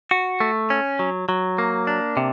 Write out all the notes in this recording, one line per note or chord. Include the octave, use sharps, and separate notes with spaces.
F#4
A3
C#4
F#3
F#3
A#3
D4
C3